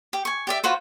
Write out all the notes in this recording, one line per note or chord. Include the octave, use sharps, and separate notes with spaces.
G4
G#5 C#6
G4 D5 E5
F4 F#4 B4 C5